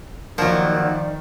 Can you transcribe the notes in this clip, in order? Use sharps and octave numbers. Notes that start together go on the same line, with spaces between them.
D#3 F3 F#3 A#3 D5